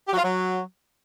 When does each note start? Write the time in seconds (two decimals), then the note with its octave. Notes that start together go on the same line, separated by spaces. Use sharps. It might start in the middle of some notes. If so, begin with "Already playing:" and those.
0.06 G4
0.12 F#3
0.17 F4
0.23 F#3